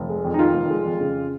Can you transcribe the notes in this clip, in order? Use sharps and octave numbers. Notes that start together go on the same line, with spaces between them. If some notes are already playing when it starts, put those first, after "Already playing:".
Already playing: F1
G#3
F2
D#4
D#3 F4
F1
G#3
F2
C#3